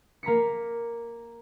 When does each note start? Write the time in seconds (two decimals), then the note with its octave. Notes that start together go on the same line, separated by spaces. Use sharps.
0.23 A#3 A#5 B6 C#7